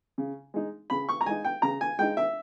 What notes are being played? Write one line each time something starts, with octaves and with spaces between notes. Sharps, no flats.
C#3
G#3 D#4
C#3 B5
C#6
A#5
G#3 D#4 G#5
G5
C#3 A#5
G#5
G#3 D#4 G5
E5